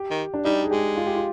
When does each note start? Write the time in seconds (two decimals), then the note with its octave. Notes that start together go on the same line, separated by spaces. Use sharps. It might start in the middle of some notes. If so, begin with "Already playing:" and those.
Already playing: G4
0.11 D#3
0.34 D4
0.45 G3 D#4
0.64 G#4
0.71 G#3 G4
0.97 F4
1.07 G4
1.16 F4